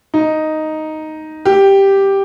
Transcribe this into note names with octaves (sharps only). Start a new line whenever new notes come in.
D#4
G4